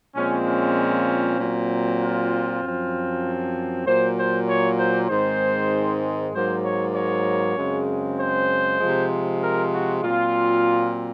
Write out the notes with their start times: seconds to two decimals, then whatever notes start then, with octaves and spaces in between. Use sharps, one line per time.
0.15 A#2 F3 G#3 C4 C#4
0.47 C#4
1.38 A#2 F#3 C4
2.00 F4
2.62 F#2 F3 C4
3.86 A#2 F#3 A#3 C5
4.17 C5
4.47 C#5
4.79 C5
5.09 G#2 D#3 G#3 C4 C5
6.33 G#2 F#3 A#3 C5
6.64 C#5
6.95 C#5
7.56 F#2 C#3 G#3 C4
8.19 C5
8.81 C3 F3 G#3
9.42 A#4
9.72 F#4
10.03 A#2 F#3 C4 F4